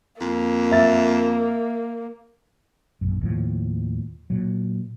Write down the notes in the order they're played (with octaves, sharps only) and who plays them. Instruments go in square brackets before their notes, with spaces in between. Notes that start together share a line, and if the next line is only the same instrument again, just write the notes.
[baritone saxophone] F2 [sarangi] A#3
[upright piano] E5 A6
[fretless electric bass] A#1 F#2
D#2 A2 F3
A#2 F#3